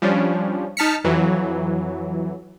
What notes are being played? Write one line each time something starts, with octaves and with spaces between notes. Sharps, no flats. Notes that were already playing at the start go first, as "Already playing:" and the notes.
F3 G3 C#4 D4
D#4 A5 F6 B6 C#7
F2 E3 F#3